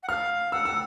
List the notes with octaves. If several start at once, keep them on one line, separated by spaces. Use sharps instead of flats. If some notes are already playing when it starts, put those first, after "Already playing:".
F#5
F5 F6
F#5 E6
E6